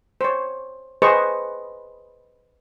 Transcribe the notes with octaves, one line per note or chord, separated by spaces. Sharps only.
C5 C#5
G#4 B4 C5 D#5 C#6